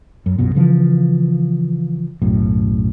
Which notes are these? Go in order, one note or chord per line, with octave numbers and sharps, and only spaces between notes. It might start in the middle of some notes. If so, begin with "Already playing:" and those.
F#2
A#1 F#2 B2
C#3 E3 F3
B1 F#2 A2